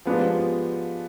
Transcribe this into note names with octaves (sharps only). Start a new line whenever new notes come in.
F3 G#3 B3 D4 G4